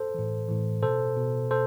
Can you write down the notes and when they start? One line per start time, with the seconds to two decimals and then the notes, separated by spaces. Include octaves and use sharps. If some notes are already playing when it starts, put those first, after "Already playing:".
Already playing: A4 C5
0.14 A2 E3
0.49 A2 E3
0.83 B2 A4 C5
1.17 B2
1.50 B2 A4 C5